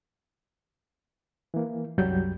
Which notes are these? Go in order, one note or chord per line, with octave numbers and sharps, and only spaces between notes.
E3 A#3
C2 F#2 F#3 G3 G6